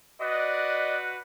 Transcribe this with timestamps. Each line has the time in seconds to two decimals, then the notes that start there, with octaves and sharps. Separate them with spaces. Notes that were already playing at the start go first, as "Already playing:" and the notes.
0.21 F#4 B4 D5 D#5